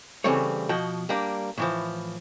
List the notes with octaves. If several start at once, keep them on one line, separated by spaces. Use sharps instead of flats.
C#3 E3 G3 A3 C4 C#5
B2 F3 F#4 G5
G3 A#3 D4
A2 E3 F3